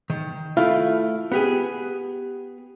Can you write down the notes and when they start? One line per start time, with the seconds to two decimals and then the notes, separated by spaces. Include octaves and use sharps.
0.10 D#3
0.57 A3 E4 F4 F5
1.32 B3 G4 G#4